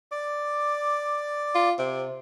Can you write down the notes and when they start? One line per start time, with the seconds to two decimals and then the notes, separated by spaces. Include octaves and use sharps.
0.12 D5 D6
1.55 F4
1.79 C3